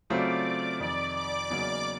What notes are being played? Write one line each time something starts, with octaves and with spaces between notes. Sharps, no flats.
C#3 F#3 A3 C4 F4 D5 D6
F2 C3 D#3 D5 D6
D5 D6
E2 C#3 F#3 A#3 D#4